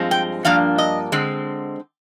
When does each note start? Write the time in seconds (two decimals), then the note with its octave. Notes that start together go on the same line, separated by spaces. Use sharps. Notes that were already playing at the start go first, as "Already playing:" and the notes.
Already playing: G2 F3 G#3 C4
0.11 G5
0.45 G2 F3 A#3 D4 F5
0.78 D#5
1.12 D3 G#3 C4